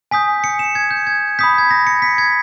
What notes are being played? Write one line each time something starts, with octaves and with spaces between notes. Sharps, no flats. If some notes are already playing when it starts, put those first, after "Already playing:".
G#5 D#6 G6 B6
C#7
E7
G#6
G6
G#6
B5 D#6 G6 B6
G#6
A#6
C#7
B6
G#6